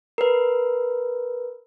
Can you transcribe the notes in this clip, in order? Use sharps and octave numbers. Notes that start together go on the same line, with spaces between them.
A#4 B4